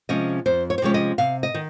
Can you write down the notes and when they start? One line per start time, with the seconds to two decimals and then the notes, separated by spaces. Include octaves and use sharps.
0.09 C3 F3 G#3 C#4 D#5
0.46 F2 C5
0.70 C#5
0.78 C5
0.82 C3 F3 G#3 C#4 C#5
0.94 D#5
1.18 C3 F5
1.43 D#5
1.54 D#3